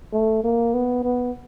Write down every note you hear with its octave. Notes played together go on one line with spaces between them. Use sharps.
A3
A#3
B3
B3